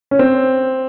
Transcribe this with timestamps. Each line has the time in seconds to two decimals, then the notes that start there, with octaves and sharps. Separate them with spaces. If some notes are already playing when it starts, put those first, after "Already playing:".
0.11 C#4
0.19 C4